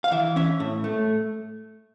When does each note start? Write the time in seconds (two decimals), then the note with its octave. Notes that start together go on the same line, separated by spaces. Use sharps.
0.04 F5
0.12 E3 E5
0.36 C#4 E5
0.60 A2
0.84 A3